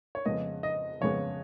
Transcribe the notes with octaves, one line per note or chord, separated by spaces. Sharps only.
C#5
F2 C#3 G#3 B3 D#5
D#5
F2 C#3 G#3 B3 C#5